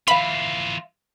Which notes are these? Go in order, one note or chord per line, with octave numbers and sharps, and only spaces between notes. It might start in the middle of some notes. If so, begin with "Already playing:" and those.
E3 F4 E5 F5 B5